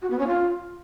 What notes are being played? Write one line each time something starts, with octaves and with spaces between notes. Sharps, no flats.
F#4
B3
C#4
F4